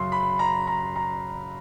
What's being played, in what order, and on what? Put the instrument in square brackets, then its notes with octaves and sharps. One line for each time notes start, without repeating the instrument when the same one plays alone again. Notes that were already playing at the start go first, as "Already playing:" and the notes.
Already playing: [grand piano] F#2 C#3 F#3 C6
B5
A#5
A#5
A#5